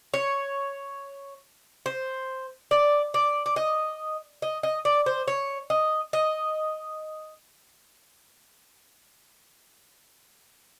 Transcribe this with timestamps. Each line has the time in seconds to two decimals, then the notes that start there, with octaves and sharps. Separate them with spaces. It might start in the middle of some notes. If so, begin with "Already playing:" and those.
0.14 C#5
1.86 C5
2.71 D5
3.14 D5
3.46 D5
3.56 D#5
4.42 D#5
4.63 D#5
4.85 D5
5.06 C5
5.28 C#5
5.70 D#5
6.13 D#5